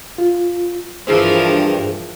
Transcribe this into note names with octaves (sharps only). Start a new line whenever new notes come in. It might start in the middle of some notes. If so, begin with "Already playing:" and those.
F4
G2 E3 F3 G#4 A#4 C5